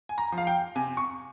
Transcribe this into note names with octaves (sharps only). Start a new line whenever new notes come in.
G#5
A#5
F3
F5
G5
C3 G#5
C#6